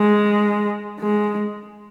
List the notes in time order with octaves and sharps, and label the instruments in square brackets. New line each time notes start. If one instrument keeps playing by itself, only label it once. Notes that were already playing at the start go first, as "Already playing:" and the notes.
Already playing: [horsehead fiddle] G#3
G#3